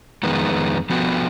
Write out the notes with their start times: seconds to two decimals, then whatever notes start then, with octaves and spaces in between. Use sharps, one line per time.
0.23 F2 D#3 G#3 B3
0.90 F3 B3 F#4